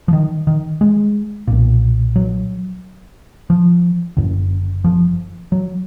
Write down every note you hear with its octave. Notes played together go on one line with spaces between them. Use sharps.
F3
D#3
D#3
G#3
B1 A#2
F#3
F3
F#1 F#2 D3
F3
F#3